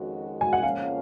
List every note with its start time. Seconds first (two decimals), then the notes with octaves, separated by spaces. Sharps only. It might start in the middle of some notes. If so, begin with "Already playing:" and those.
Already playing: F2 D#3 G#3 C#4 F#4
0.41 G#5
0.53 F#5
0.63 F2 C#3 F3 A#3 C#4 F5